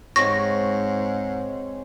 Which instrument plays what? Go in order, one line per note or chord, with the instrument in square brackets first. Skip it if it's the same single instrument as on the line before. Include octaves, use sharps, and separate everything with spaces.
[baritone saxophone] G#2 [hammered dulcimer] G#3 C4 C#5 [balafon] C#6 [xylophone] A#6